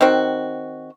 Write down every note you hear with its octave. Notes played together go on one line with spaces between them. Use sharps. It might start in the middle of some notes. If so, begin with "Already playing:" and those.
D#3 C4 F#4